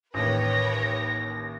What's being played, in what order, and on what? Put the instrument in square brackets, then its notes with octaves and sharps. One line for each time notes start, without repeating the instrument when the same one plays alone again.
[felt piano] A1 D#2 [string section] B4 C#5 G5 [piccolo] A#6